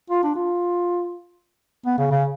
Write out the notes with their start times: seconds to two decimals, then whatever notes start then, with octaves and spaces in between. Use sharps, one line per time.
0.10 F4
0.23 D4
0.35 F4
1.86 B3
1.98 C#3
2.11 C#3